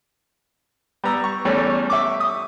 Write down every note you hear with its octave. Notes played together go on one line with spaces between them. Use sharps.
G3 B3 A#5 E6
C#6
E2 G3 A3 C#4
E5 C#6 D6
D#6